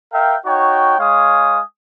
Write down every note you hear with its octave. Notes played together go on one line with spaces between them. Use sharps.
A#4 E5 F5 G5
D#4 F#4 C#5 G5
G#3 C#5 F5 G#5 D#6